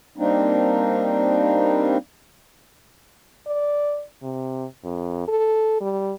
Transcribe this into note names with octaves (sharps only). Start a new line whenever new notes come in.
G3 A#3 C4 D4 D#4
D5
C3
F2
A4
G3